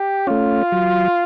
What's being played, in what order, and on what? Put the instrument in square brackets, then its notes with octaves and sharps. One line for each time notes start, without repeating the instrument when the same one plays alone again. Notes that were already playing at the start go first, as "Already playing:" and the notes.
Already playing: [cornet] G4
[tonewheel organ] A3 C#4 [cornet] F4
[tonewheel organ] F#3